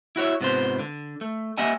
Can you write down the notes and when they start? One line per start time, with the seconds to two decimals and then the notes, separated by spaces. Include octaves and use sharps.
0.16 E4 F#4 C#5 E5
0.41 G#2 C3 B3 F4 C5
0.79 D3
1.21 A3
1.58 A#3 G4 D#5 E5 F#5 G#5